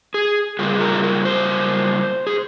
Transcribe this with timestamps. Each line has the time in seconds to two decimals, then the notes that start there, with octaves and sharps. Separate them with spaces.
0.14 G#4
0.59 C#3 G3 A#3 F4 G#4
0.80 A#4
0.93 G#4
1.03 A#4
1.25 C5
2.27 G#4